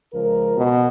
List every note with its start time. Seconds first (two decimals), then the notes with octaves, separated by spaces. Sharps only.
0.13 C#2 F3 A#4
0.57 B2